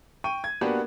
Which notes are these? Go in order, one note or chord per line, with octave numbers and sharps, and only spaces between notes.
G5 C#6 D#7
G#6
A#3 B3 D4 F#4 G4 B4